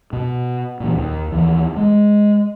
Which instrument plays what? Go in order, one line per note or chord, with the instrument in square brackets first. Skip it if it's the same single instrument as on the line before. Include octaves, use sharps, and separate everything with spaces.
[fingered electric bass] B2
A#2 E3
D#2
D#2 E3
G#3